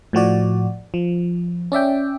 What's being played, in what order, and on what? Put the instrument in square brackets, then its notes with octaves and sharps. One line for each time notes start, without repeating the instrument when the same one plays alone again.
[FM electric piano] A2 F3 F#4 D5
F3
C#4 D5 E5 G5